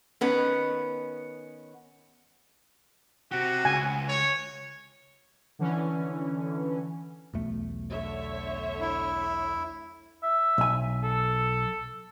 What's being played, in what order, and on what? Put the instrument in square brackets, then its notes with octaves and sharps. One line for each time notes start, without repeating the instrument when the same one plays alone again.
[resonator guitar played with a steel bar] D#3 B3 C#4
[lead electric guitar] C4 G4 [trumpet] F#4
[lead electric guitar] C#2 [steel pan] G#5
[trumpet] C#5
[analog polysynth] D3 E3 C#4
[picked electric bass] B1 E2 A3
[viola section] D3 C#5 E5
[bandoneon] E4
[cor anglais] E5
[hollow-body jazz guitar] B1 G#5
[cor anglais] A4